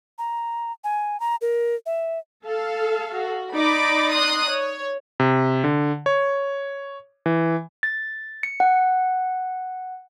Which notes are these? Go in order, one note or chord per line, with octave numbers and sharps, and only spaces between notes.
A#5
G#5
A#5
A#4
E5
A4 F5
F#4
D#4 D5 B5 D6
C6 D#6 F#6
C#5
C3
D3
C#5
E3
A6
C#7
F#5